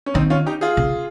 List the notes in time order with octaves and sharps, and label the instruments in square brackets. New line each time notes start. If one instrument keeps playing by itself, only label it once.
[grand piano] C#4
[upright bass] D#3 [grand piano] C4 D#4
[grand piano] C#4 F4
D#4 G4
F4 G#4
[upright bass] C#3